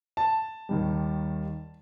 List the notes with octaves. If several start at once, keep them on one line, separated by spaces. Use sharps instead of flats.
A5
D#2 D#3 G3